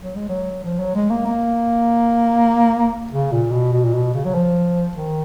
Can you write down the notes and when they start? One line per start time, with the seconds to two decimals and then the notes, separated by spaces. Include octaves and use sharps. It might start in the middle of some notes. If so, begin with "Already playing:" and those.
0.02 F#3
0.15 G#3
0.29 F#3
0.64 F3
0.79 F#3
0.95 G#3
1.10 A#3
1.26 A#3
3.11 C#3
3.32 A#2
3.52 B2
3.73 B2
3.84 A#2
3.93 B2
4.14 C#3
4.25 F#3
4.34 F3
4.96 D#3